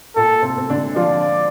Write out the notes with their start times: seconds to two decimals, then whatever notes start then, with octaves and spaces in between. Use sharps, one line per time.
0.16 A#2 A#3 A4
0.42 C3 C4
0.58 C4
0.70 D3 D4
0.96 F3 F4 D5